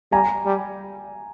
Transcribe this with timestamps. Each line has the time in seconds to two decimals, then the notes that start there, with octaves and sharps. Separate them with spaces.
0.12 G3 G#5 A#5
0.46 G3